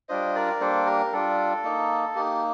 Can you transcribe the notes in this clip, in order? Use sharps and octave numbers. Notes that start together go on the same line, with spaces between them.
G3 D4 F4 C5 D#5
A#4 D5
G3 A#3 D4 A4 C5
G4 A#4
G3 D4 F4 A4
A#3 D#4
A#3 D#4 G4